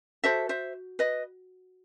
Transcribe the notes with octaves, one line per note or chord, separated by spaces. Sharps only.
F#4 A4 C5 E5
C5 E5
B4 D#5